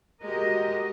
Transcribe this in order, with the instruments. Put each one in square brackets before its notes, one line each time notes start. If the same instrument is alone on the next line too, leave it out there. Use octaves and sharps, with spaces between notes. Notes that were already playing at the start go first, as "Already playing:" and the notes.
[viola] G#3 G4 [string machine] F#4 [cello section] A#4 D#5